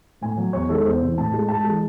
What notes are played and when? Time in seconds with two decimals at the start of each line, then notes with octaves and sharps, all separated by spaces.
0.21 A2 G#5
0.38 F#3
0.53 E2 C#5
0.69 D#3 G#3 A4
0.85 E2 C5
1.02 C3 E3
1.17 A2 A5
1.34 G#3
1.48 G#2 A5
1.64 E3 G#3